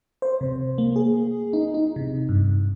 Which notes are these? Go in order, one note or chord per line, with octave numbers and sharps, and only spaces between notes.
C5
C3
A#3
G#4
D#4
D#4
C3
G2